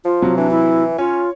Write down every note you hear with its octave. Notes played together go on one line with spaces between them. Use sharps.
F3 F4
C3 F#3
E3 D4
E4
C#4 F4 C#5